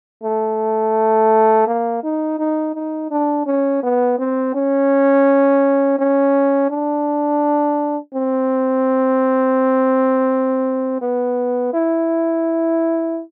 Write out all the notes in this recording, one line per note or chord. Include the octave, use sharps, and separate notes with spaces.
A3
A#3
D#4
D#4
D#4
D4
C#4
B3
C4
C#4
C#4
D4
C4
B3
E4